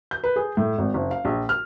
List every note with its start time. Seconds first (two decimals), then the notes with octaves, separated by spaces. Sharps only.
0.11 G6
0.24 B4
0.36 G#4
0.57 A2
0.78 G#1
0.94 F#1
1.11 F5
1.25 A#1
1.49 F6